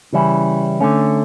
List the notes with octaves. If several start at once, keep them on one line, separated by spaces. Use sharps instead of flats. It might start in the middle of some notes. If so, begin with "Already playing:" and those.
C#3 E3 G3 C#4 E4
D3 A3 C#4